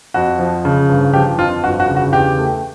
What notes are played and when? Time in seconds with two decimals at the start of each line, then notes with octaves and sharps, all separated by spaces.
0.14 F2 F#4
0.39 F3
0.65 C#3
0.89 G1
1.13 F3 G4
1.39 F2 F4
1.63 G1 F#4
1.80 F#4
1.88 C#3
1.97 F#4
2.13 E2 G4
2.38 A3